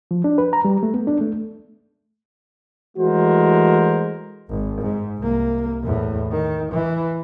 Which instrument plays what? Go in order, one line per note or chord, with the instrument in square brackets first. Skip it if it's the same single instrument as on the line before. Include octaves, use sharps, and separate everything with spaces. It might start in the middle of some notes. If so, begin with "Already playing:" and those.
[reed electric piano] F3
D4
B4
A#5
G3
A3
B3
D4
A3
[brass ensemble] E3 G#3 A3 F#4 A#4 C5
[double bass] G#1
G#2
C2 A#3
E2 A2
D#3
E3